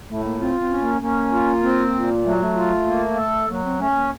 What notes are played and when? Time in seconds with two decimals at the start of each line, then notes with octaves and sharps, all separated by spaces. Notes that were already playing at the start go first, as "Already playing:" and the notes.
0.08 A2 A3
0.24 A#3
0.39 C4 F4
0.60 C4
0.70 C#4
0.80 A#3
1.01 A#3 C#4
1.32 F4
1.63 C4
1.94 A#2
2.25 F#3 A3
2.40 A3
2.55 F4
2.86 A#3
3.17 A4
3.48 F#3 A#3
3.64 C4
3.79 A3 C#4
3.91 A3
3.95 A#3